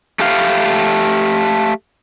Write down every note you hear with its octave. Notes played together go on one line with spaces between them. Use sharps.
A3 G4 F5